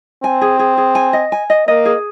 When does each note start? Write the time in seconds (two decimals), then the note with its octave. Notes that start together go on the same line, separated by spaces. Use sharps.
0.23 C4 G#5
0.41 G#4
0.59 G#4
0.77 G#4
0.95 G#5
1.13 D#5
1.32 G#5
1.50 D#5
1.68 A#3 D#5
1.85 G#4